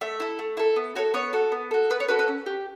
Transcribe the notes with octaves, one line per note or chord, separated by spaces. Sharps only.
A3 E5
E4 A4
A3
E4 A4
B3
F#4 A4 C#5
B3 C#5
F#4 A4
B3
F#4 A4
B3 B4
C#5
F#4 A4 B4
B4
C#4
G4